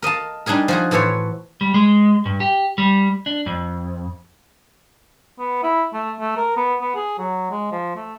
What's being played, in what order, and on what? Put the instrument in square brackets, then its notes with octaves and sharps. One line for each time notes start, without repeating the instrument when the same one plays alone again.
[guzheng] A#4 D#5 F5 A5
G3 D4 D#4 G#4 A#4
F3 F#4 G#4
A2 E3 A4 C5 C#5
[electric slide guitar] G3
G#3
G2
G4
G3
D4
F2
[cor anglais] B3
E4
A3
A3
A#4
B3
B3
G#4
F#3
G#3
F3
A3